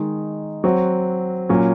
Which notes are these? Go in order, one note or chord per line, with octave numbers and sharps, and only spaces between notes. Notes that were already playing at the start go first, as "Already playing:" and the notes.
Already playing: D#3 G#3 D#4
F#3 C4 F#4
A#2 F#3 C#4